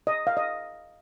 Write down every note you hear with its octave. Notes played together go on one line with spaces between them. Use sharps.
D#5
F5
D#5